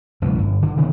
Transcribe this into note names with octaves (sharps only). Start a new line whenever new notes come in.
C#2 F#2 B2 E3
G1
D3
C3 D#3 E3 B3